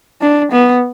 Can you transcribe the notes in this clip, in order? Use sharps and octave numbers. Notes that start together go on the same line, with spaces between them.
D4
B3